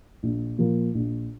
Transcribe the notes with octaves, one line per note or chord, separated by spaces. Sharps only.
A#1
A#2 F3 A#3
A#1